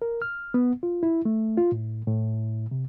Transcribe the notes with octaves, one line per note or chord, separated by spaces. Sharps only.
A#4
F6
B3
F4
E4
A3
F4
A2
A2
C3